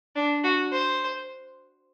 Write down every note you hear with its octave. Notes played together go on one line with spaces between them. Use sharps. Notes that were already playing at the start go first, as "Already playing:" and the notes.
D4
F#4
C5